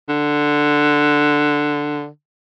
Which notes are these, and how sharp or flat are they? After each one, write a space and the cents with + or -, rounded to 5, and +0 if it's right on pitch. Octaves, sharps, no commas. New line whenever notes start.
D3 +5